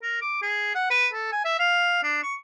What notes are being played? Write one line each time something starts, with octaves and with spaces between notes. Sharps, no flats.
A#4
D6
G#4
F#5
B4
A4
G#5
E5
F5
D4
C#6